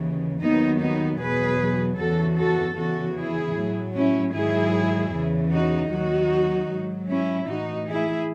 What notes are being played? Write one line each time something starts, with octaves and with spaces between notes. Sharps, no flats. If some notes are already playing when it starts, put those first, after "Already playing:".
Already playing: D#2 C#3 E3
D#2 D#3 F#3 B3 D#4
B3 D#4
E2 B2 F#3 G#4 B4
E2 C#3 E3 F#4 A4
F#4 A4
E2 C#3 E3 F#4 A4
E4 G#4
A2 F#3
C#4 E4
G#2 D#3 F#3 E4 G#4
E2 C#3 E3
D#4 F#4
D#2 D#3 F#3 D#4 F#4
G#2 F#3
C#4 E4
A2 E3 D#4 F#4
E4 G#4